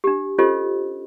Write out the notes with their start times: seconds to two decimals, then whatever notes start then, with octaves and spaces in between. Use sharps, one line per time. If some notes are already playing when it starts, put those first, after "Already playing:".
0.04 D4 G4
0.38 C#4 F4 G4 A4 C5 D#5